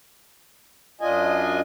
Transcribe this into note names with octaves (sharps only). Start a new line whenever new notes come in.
F#2 D4 F4 D#5 G#5